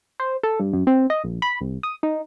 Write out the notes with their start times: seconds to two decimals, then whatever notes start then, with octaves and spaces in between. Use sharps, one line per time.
0.20 C5
0.43 A4
0.60 G2
0.73 F#2
0.87 C4
1.10 D#5
1.24 A#1
1.42 B5
1.61 C2
1.83 D#6
2.03 D#4